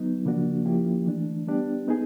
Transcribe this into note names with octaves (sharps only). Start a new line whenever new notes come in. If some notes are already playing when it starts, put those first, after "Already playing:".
Already playing: F#3 B3 D#4
C#3 F3 A#3 D4 F#4
F3 A#3 C#4 E4 G4
E3 A3 D4
G3 B3 D4 G4
B3 D#4 G#4